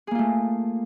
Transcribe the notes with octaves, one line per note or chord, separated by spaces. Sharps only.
A3 A#3 F4 G#4